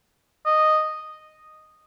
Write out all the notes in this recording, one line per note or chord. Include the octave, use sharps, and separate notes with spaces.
D#5